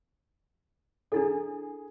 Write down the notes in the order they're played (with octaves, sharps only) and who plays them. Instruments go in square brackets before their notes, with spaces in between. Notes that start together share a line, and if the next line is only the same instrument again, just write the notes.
[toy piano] D4 E4 A4 [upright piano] G#4